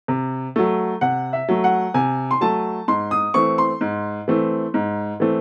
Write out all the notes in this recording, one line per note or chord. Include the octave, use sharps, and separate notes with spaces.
C3
F#3 A3
C3 F#5
E5
F#3 A3
F#5
C3 G#5
C6
F#3 A3 A5
G#2 C6
D#6
E3 A3 C4 C#6
C6
G#2
E3 A3 C4
G#2
E3 A3 C4